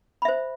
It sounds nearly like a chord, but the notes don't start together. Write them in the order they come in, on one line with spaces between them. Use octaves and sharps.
B5 E5 C5